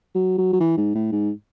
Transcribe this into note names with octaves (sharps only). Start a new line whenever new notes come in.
F#3
F#3
F#3
E3
G#2
A2
G#2